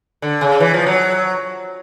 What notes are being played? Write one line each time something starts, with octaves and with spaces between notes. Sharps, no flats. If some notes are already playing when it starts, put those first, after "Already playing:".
D3
C#3
E3
F3
F#3